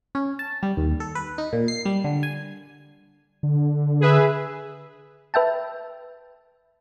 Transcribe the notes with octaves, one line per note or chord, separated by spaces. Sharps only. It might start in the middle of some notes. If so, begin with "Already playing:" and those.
C#4
A5
G3
D#2
A4
B4
D#4
A#2
C7
G3
D3
G#5
D3
G#4 B4 E5
B4 E5 G5 A5